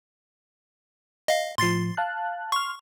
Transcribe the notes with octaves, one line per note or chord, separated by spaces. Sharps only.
D#5 F5
A2 F3 C6 A6 C7
F5 A5 F#6
C6 C#6 F6